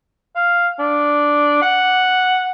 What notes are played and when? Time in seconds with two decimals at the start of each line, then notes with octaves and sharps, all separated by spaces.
0.36 F5
0.79 D4
1.62 F#5